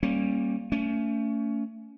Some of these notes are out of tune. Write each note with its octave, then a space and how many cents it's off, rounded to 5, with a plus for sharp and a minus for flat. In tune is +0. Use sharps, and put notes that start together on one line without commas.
G3 +0 A#3 +0 C#4 -30
A3 +30 C#4 +30